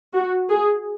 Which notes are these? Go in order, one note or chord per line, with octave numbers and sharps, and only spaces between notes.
F#4
G#4